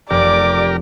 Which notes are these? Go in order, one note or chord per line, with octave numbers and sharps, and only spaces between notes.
F1 G4 A#4 D5 D6